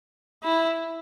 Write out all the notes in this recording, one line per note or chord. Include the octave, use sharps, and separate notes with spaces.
E4